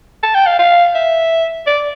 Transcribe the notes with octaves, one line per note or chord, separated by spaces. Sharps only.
A5
G5
F5
F5
E5
D5